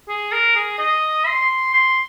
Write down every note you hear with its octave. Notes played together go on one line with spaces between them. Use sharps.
G#4
A#4
G#4
D#5
C6
C6